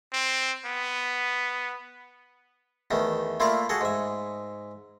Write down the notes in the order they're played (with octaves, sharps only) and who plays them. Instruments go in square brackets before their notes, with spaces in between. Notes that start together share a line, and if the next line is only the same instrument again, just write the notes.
[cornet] C4
B3
[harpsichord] E2 D#3 A3
A3 A#3 E4 F4 D5 F5
F#4 G#4 A4
G#2 E5